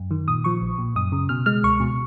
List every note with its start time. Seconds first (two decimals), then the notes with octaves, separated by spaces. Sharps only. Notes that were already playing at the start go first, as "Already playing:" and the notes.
Already playing: F#2
0.11 D#3
0.28 A#2 D#6
0.44 F3 C#6
0.61 A#1
0.78 A#2
0.96 F#2 D#6
1.12 C#3
1.29 B2 F6
1.46 G#3 F6
1.63 C#2 C#6
1.80 B2